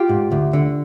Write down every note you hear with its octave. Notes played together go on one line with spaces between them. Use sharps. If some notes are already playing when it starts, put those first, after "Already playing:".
Already playing: F4 G4
G#2
D2
D3